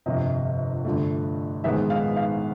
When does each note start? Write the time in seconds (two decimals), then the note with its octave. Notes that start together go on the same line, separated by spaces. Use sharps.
0.06 G1 F2 C3 D#5
0.85 G2 D3 F3 A3
1.64 A#1 G#2 D#3 G#3 B3 E5
1.90 F5
2.17 F5